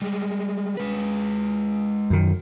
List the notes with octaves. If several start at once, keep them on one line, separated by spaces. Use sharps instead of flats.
G3 G#3
G#3 B4
F#2 D#3